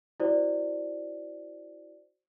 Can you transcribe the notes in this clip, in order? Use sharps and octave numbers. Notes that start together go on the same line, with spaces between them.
E4 F#4 C5 D5